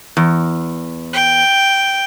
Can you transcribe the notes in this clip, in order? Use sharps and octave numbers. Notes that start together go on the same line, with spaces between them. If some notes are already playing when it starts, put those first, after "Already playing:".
E2
G5